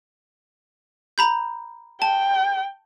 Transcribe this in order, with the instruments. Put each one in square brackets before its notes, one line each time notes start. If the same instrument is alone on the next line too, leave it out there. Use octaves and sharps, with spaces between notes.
[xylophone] A#5 B5 G6
[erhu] G5 [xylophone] A5